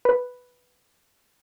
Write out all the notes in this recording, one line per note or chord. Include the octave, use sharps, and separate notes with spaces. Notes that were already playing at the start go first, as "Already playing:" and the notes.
B4